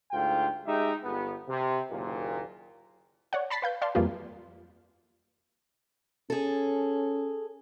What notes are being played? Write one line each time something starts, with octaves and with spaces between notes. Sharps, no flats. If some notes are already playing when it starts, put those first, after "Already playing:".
D2 G#2 F4 G5
G#3 D#4 G4 E5
G1 B3
C3
F#1 D#2 A#2
C#5 D5 F#5
A5 B5 A6 B6 C7
B4 F5 G6
D5 F5 A5 C6
F2 E3 F3 G3 A#3 F4
C#4 G#4 A4